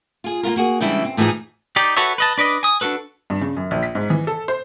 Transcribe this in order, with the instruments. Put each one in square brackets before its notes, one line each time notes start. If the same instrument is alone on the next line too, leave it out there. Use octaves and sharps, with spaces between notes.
[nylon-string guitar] F4 G#4
A#3 B3 F4 A#4
A#3 F#4 G#4
C#3 E3 G3 G#3 D4 E4
C4
A2 E3 F3 D#4 G#4
[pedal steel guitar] D#4 G4 D5
F#4 A4 B4 C#5 E5
B4 D#5 A5
D4 B4 D5 D#5
G#5 D#6
D4 E4 F#4 A4 B4
[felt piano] G2
C#3
F#2
A#1
B6
G#2
E3
A4
C5